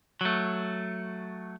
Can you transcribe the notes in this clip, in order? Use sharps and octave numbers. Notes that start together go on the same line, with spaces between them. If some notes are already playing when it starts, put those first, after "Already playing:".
F#3 A3